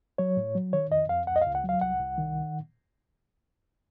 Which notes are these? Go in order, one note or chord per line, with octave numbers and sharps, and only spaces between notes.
F#3 C#5
A2
F#3
D#3 C#5
F2 D#5
F2 F5
C#2 F#5
D#5
F5
C#2
F#5
F#3
F5
C2 F#5
C2
D#3